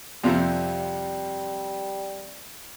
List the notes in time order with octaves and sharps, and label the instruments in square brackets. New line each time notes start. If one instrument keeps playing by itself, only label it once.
[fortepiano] F2 C3 F3 [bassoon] G3